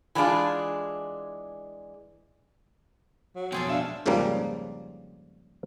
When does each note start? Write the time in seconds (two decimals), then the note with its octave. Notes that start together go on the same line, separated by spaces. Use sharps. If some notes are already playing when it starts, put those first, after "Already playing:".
0.15 E3 F#3 G#3 D4 F4 G#4
3.36 F#3
3.52 F2 B2 C4 G#4 A4
3.69 D4 E5 F5
4.06 F2 G#2 C#3 F3 G3 A#3